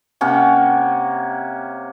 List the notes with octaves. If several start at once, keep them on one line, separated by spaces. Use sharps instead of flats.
C3 A#3 C#4 F#5